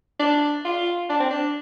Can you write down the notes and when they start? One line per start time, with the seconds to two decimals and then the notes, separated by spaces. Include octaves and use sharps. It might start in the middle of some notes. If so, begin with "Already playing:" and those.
0.20 D4
0.65 F4
1.10 D4
1.20 C4
1.31 D4